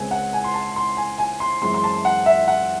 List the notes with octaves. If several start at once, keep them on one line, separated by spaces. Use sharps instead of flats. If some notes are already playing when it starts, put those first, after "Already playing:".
Already playing: C#2 C#3 G#3 C4 G#5
F#5
G#5
C6
A5
C6
G#5
G#5
C6
F#2 E3 G#3 C4 C6
C6
A5
F#5
E5
F#5